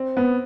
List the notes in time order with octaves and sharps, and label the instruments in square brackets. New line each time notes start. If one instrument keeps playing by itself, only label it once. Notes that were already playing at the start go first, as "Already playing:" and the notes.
Already playing: [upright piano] C4
[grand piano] B3